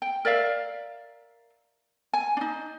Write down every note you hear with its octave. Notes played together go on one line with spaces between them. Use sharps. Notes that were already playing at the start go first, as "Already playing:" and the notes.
G5
A#4 D5 E5 F5
G#5
D4 D#4